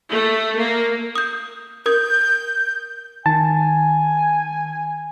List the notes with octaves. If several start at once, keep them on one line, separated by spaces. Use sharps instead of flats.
A3
A#3
D#6 G6
A#4 D#6 G6 G#6
D#3 G#5 A5